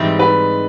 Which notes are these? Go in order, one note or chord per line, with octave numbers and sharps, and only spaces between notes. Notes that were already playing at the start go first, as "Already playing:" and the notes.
Already playing: G#2 E3 G3 C4 D#4
B4